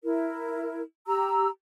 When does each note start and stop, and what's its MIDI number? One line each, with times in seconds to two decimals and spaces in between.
0.04 0.82 64
0.04 0.82 70
1.07 1.49 67
1.07 1.49 82
1.07 1.49 88